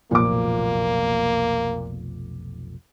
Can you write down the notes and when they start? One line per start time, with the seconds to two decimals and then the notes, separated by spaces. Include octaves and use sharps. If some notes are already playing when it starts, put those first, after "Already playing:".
0.11 F1 B1 A#2 F3 A#3 D6